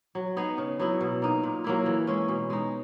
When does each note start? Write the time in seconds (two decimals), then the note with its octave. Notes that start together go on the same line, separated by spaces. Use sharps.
0.15 F#3
0.37 B3 D#4 G#4
0.58 C#3
0.79 F#3 B3 E4
1.01 B2
1.22 A#3 D#4
1.43 A#2
1.64 F#3 A#3 E4
1.86 E3
2.07 G#3 C#4
2.28 B2
2.50 G#3 D#4